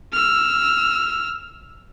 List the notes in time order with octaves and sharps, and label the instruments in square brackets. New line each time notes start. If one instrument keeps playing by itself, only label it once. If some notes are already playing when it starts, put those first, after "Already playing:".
[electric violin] E6 F6